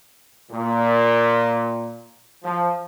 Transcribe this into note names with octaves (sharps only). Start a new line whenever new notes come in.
A#2
F3